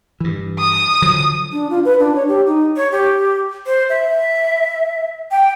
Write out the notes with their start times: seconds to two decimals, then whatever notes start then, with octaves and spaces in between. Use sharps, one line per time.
0.20 G2 E3
0.58 D#6
1.02 D3 F3 F#3
1.53 D4
1.70 F4
1.85 B4
1.99 D4
2.15 C#5
2.28 G4
2.46 D#4
2.76 C#5
2.92 G4
3.66 C5
3.89 E5
5.31 G5